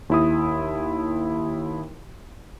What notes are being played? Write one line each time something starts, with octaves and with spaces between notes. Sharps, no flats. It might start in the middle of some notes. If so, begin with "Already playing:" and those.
D#2 E4 D#6